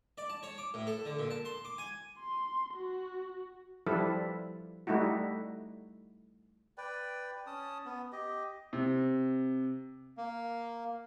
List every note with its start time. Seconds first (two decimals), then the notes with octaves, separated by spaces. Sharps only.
0.18 D5
0.30 A5
0.43 C#5
0.58 D6
0.74 A2
0.87 A4
1.05 D3
1.19 A#2
1.30 A5
1.45 C6
1.65 D6
1.78 G#5
2.19 C6
2.74 F#4
3.87 F3 G3 E4 A4 B4
4.87 G3 A3 D#4 E4 F#4
6.78 B4 D5 G5
7.46 C#4 A5 D#6
7.86 B3
8.12 G4 D#5
8.73 C3
10.18 A#3